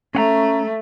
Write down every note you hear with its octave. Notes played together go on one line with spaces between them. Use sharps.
A3 C#4 F#5 A#5